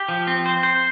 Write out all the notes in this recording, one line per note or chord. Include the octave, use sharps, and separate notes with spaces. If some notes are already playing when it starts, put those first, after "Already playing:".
Already playing: G4
F3
C4
C5
C5